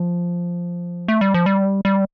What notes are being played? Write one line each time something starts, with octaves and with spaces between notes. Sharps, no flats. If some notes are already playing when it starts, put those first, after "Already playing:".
Already playing: F3
A3
G3
F3
G3
G3